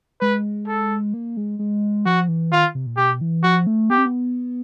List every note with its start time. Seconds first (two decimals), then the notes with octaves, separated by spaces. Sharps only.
0.21 G#3 B4
0.67 A4
1.14 A#3
1.37 G#3
1.59 G#3
2.06 F3 F#4
2.28 E3
2.52 D#3 F4
2.75 C3
2.86 A#2
2.97 B2 G4
3.21 E3
3.43 F3 F#4
3.67 A3
3.90 B3 G4
3.98 C4
4.06 B3